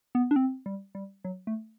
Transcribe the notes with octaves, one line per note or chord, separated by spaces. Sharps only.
B3
D4
C4
G3
G3
F#3
A3